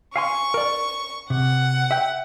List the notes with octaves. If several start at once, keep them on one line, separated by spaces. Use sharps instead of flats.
F5 G#5 C6 C#6
A#4 D5
C3 F#5
E5 G5